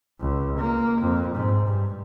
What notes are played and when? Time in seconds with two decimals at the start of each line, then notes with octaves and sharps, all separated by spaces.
0.20 C#2
0.58 A#3
1.01 F2
1.35 G#2
1.68 G2